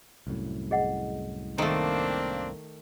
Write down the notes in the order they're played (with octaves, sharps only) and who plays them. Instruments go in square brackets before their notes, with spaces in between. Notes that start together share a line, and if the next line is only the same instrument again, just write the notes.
[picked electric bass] C2 F#2 A2
[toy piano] G#4 D#5 F#5
[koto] D#3 A3 [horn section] A#3 C4 D4